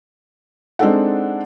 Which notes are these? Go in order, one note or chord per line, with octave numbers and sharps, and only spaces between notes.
G#3 C4 D4 D#4 A4 F#5